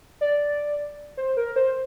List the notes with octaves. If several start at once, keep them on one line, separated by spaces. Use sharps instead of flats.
D5
C5
A#4
C5